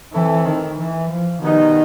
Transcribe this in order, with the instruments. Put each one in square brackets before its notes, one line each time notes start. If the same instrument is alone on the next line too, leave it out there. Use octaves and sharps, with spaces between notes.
[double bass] E3 [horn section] A3 C4 E4 A4
[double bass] D#3
E3
F3
[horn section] B2 G3 B3 D#4 [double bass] D#3